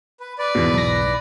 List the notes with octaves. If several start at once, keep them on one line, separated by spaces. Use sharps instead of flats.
B4
B4 D5
E2 G#2 B2
B1 A#6